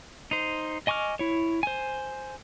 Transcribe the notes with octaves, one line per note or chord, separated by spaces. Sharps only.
D#4 C5
D#5 G#5 C#6 D6 F6
E4 C#5
C5 G#5